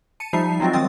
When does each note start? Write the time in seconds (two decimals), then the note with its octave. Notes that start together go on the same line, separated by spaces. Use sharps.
0.20 A5 C#7 D#7
0.33 F3 G3 D#4 E5 C7
0.60 F#3 G#3 C4 F4 F#4
0.73 D#3 C4 F#4 D#6 A6